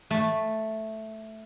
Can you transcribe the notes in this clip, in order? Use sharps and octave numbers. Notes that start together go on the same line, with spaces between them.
A3